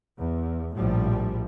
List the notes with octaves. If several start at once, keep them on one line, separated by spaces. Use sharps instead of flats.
E2
A#1 A2 F3 G3